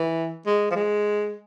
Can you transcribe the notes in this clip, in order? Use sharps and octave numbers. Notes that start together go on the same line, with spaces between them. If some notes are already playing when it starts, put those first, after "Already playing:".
Already playing: E3
G#3
F3
G#3